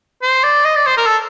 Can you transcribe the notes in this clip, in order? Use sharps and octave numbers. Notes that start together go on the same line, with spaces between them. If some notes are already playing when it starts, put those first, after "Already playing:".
C5
D5
D#5
D5
C5
A#4
A4